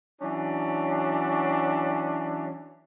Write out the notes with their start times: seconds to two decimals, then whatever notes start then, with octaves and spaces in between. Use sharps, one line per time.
0.21 E3 F#3 C#4 D4